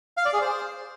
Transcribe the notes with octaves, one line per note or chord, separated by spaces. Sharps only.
F5
D5
G#4
C5